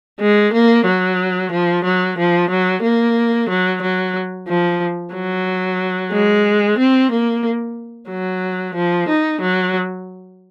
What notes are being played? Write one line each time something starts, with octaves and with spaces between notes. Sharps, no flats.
G#3
A#3
F#3
F3
F#3
F3
F#3
A#3
F#3
F#3
F3
F#3
G#3
C4
A#3
F#3
F3
D#4
F#3